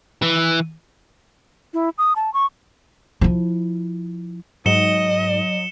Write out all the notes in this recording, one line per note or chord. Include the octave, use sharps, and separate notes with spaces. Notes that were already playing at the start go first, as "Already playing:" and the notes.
E3
E4
D#6
A5
C#6
F3 E4
G#2 F#3 D#5 C#7 E7 G7